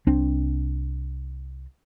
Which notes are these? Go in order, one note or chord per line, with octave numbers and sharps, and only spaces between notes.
C2 C4 D4